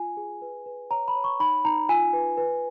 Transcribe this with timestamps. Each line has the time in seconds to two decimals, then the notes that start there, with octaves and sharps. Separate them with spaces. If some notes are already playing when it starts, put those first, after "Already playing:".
Already playing: F4 G#5
0.17 G#4
0.42 B4
0.66 B4
0.91 C#5 A#5
1.08 B5
1.16 C#5
1.24 C#6
1.40 D#4 B5
1.65 D#4 A#5
1.89 F4 G#5
2.13 B4
2.38 B4